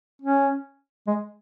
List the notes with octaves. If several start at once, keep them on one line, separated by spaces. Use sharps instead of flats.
C#4
G#3